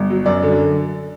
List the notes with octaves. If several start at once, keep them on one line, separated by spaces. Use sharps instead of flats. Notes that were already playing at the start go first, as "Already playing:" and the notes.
Already playing: G1
F#3
F#2 D5
D3